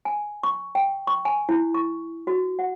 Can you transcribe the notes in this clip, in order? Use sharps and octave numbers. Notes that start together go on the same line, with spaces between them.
G#5
C#6
G5
C#6
G#5
E4
C#6
F#4
F#5